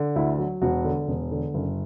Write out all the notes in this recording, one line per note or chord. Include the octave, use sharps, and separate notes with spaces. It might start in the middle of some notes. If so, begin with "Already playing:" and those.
Already playing: D3
D2 E4
F#3
E1 F#4
D3
E1
D3
F#1